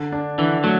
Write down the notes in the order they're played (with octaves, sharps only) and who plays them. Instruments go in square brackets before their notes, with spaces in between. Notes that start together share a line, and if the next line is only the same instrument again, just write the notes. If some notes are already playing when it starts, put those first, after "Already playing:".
Already playing: [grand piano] D3
D4
[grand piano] D3 [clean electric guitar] E3
[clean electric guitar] F#3 [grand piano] A3